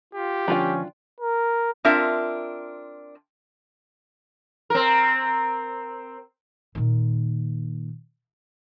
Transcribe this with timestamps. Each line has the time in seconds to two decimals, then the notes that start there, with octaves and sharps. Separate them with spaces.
0.14 F4 G4
0.48 D2 G#2 F3 C#4 D4 F4 G5
1.20 A#4
1.85 C4 D4 F4 A#4 E5
4.70 C4 A#4
6.75 A#2 D#3